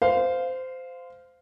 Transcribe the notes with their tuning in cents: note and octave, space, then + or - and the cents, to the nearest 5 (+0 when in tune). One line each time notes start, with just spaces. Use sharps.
C5 -20 F5 +0